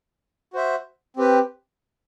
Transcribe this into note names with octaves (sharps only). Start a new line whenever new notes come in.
F#4 C5 E5
C4 G4 B4